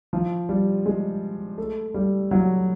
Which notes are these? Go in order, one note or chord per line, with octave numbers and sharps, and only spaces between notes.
F3
G3
G#3
A3
G3
F#3